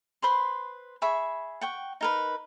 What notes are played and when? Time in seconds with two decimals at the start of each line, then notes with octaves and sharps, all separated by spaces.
0.22 B4 C5 B5 C6
1.02 G#4 E5 B5 C#6
1.61 F#5 G5 C#6
2.01 D#4 A#4 B4